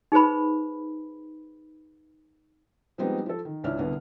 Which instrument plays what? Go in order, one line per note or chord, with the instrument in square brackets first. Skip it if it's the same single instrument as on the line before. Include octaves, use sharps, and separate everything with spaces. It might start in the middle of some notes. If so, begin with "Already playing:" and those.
[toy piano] D#4 G#4 B4 C5 B5
[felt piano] F3 G3 G#3 B3 C4 D#4
F3 A4
D#3
C#2 C#4 D4 E4 F6
C2 D3 B3